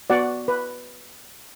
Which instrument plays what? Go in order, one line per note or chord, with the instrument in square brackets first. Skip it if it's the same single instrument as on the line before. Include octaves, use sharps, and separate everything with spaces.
[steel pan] B3 F#4 D5 F#5
B4